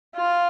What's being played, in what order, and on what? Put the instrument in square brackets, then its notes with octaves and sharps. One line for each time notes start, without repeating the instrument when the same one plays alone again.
[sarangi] F4